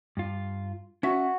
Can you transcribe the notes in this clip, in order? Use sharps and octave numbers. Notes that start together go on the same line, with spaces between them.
G2 F4
C#4 F#4 E5